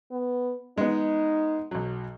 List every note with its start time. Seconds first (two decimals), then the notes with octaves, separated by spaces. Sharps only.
0.11 B3
0.78 G#3 B3 D#4
1.71 B1 F#3